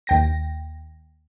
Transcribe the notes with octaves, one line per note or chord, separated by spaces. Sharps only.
D#2 G5 A#6